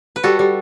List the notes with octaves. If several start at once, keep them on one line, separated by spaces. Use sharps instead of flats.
B4
G3 F#4 A4
G3